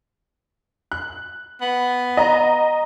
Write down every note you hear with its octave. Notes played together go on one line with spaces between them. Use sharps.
F#6
B3
D#5 A#5